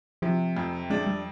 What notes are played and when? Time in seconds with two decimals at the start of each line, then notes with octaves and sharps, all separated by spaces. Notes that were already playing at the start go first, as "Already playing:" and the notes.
0.22 C3 F3
0.57 F2
0.90 G#3 D4
1.07 G3